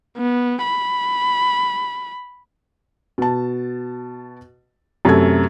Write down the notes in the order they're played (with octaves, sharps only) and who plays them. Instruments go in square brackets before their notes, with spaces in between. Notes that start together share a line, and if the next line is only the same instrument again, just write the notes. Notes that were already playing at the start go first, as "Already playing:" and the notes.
[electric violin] B3
B5
[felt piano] B2 A5
F#2 C3 A3 A4 G#6